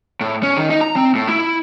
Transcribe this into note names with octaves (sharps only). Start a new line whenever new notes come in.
A2
C#4
D#3
D#4
A#5
C4
A2
E4